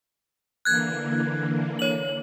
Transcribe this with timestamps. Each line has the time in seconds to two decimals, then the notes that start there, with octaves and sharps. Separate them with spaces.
0.65 D3 E3 A#3 F#6 G#6
1.79 C#5 F#7